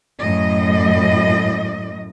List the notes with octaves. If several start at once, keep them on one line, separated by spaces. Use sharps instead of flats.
F#2 A2 D#5